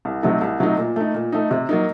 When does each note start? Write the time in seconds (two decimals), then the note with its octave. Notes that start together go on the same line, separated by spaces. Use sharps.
0.05 C2
0.23 C3 F#3 A3 D#4
0.41 C2
0.60 C3 F#3 A3 D#4
0.78 A#2
0.96 A3 D#4
1.14 A#2
1.32 A3 D#4
1.51 C3
1.69 F#3 A#3 D#4